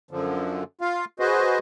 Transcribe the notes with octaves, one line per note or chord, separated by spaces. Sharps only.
F#2 D3 F3
F4 F5
F#4 G#4 B4 C5 D#5